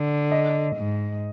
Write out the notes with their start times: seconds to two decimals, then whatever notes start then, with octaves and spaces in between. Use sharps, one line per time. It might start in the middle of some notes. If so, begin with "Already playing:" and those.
Already playing: D3
0.31 D#5
0.77 G#2